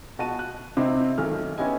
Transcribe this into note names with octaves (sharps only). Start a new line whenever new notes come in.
B2 F#4 A5 D#7
F#6
C3 C4 D#4 E4
B1 D#3 A3 F6
B3 C#4 E4 G4 D#5 G#5